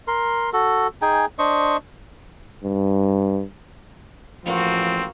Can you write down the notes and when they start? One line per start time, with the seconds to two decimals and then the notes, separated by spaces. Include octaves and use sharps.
0.08 A#4 C6
0.53 F#4 A4
1.02 D#4 G#4 G5 G#5
1.39 D4 C5 D#5 C#6
2.63 G2
4.45 A1 F3 A#3 C4 F#4